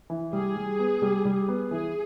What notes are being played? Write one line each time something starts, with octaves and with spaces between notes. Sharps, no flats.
E3
G3 G#4
G3
B3
G3
G3
B3
E3 G#4